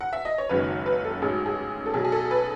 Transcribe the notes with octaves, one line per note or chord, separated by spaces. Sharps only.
F#5
E5
D#5
C#5
F#1 F#2 D#3 G#3 B4
B4
A4
A1 G#2 F#3 G#4
G#4
A4
B1 B2 F#3 G#4
G#4
A4
B4